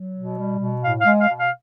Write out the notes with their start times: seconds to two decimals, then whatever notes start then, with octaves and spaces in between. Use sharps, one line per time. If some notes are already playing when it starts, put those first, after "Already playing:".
Already playing: F#3
0.14 B2
0.37 G3
0.59 B2
0.82 A2 F5
1.01 G#3 F5
1.21 F5
1.27 B2
1.40 F5